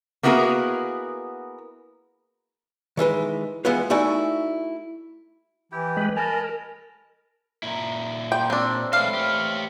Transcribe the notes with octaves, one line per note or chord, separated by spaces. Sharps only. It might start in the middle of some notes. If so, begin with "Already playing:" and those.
A#3 B3 E4 F#4 G#4 A#4
D#3 E3 G#3 B4
E3 G#3 B3 F4 B4
A3 D#4 E4 F#4 D5 G#5
E3 E4 G4 G5
G#3 B4
A#4 D#5 G#5 A5 B5
A#2 E4 A#5
G4 A#4 C5 G5
C4 D4 C5 C#5 E5
A2 E3 G#3 A4 F5 D6
G4 C#5